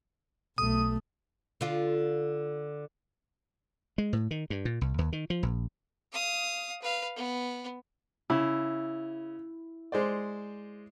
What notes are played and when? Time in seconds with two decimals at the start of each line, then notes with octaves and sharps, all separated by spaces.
0.58 B1 A3 D#6
1.61 D3 F4
3.98 G#3
4.13 A2
4.31 D#3
4.50 G2
4.65 A#2
4.81 C2
4.98 D#2
5.13 D#3
5.30 F3
5.43 A#1
6.12 F5 D#6
6.82 B4 F5
7.16 B3
8.30 C#3 E4
9.92 G#3 C5 D5